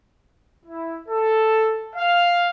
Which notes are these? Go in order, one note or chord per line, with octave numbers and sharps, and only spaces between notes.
E4
A4
F5